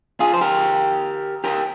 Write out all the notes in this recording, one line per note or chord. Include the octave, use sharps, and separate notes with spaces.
F4 G#4
C5
G4 A#4
G4 A#4